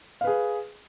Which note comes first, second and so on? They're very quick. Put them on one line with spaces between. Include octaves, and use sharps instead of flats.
F5 B4 G#4